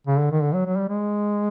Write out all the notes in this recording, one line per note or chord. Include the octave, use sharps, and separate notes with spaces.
C#3
D3
D#3
D3
F#3
F#3
G3
G#3